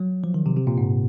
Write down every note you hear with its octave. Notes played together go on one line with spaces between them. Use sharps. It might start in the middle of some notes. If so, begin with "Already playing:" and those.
Already playing: F#3
F3
D#3
C3
C3
A#2
G#2